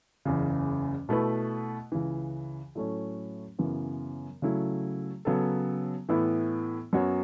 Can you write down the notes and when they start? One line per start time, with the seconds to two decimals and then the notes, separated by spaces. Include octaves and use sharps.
0.25 F#1 E2 C#3
1.09 B2 A3 E4 B4
1.92 C#2 C#3 E3
2.75 A2 F#3 A3 C#4
3.59 F#2 C#3 E3 B3
4.42 C#3 F#3 A3 E4
5.25 C#3 F#3 B3 A4
6.09 A2 E3 B3 E4
6.93 F#2 F#3 B3 F#4 C#5